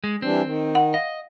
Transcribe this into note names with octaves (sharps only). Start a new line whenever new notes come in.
G#3
E3 G3 C4 D4
D#3
F#5
D#5 F5